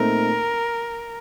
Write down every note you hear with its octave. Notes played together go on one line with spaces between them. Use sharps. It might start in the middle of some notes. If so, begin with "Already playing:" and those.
Already playing: A#2 A3 C4 D#4 A4 A#4